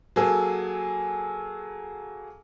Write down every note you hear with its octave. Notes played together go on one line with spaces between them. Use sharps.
F#3 A#3 G#4 A4